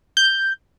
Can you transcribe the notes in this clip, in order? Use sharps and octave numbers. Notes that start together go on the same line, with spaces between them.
G6